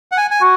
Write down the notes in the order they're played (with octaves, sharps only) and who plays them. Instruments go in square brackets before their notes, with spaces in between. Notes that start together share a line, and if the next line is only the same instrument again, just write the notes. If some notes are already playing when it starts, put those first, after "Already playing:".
[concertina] F#5
G#5
G#5
[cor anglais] F#4